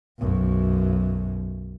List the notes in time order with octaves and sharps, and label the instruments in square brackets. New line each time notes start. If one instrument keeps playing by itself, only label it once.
[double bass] B1 F#2